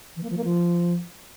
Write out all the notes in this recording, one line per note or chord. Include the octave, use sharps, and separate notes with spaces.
E3
A#3
F3
A#3
F3